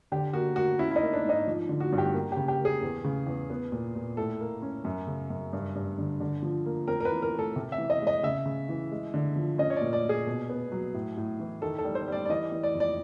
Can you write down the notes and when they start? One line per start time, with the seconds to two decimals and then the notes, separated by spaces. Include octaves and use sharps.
0.12 D3 G4
0.33 A#3 F#4
0.56 A#3 F#4
0.79 C#4 E4
0.91 E4
0.96 D#4
1.02 A#3
1.13 D4
1.25 G#2 D#4
1.47 F3
1.69 D3
1.80 F#4
1.92 G2
1.98 G4
2.14 A#3
2.32 C#3 G4
2.48 G4
2.60 A#3 G#4
2.83 E2
3.04 C#3
3.27 E2
3.50 B3
3.72 A#2
3.95 A#2
4.17 A2 A4
4.41 A#3
4.62 C#4
4.85 F#2
5.07 C#3
5.30 F#2
5.53 G2
5.75 G2
5.98 D3
6.20 D3
6.43 F3
6.66 A#3
6.88 C4 A#4
7.00 A#4
7.05 B4
7.11 E3
7.22 A#4
7.33 A3
7.39 A4
7.56 C3
7.72 E5
7.78 E3
7.90 D#5
8.02 G#3
8.07 D#5
8.23 C#3 E5
8.46 C#3
8.69 E3
8.92 G#3
9.14 D3
9.36 F3
9.58 C#4 D#5
9.70 C#5
9.76 A#2 D5
9.93 D5
10.05 A#2 G#4
10.27 B2
10.50 B3
10.72 F#3
10.94 A2
11.17 A2
11.40 E3
11.62 D#3 A4
11.78 A4
11.84 G3
11.95 C5
12.08 G3 D5
12.25 D5
12.29 E3 D#5
12.52 E3
12.63 D5
12.75 F2
12.80 D5